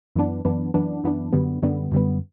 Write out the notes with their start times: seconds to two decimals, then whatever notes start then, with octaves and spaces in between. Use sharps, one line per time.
0.16 F#2 E3 B3 D4
0.45 F#2 E3 B3 D4
0.74 F#2 E3 B3 D4
1.04 F#2 E3 B3 D4
1.33 F#2 D3 G3 B3
1.62 F#2 D3 G3 B3
1.92 F#2 D3 G3 B3